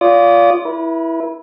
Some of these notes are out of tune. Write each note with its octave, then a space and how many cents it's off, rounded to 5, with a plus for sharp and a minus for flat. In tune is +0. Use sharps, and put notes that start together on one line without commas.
F4 +0 D5 -35 D#6 -35
E4 +0 B4 -40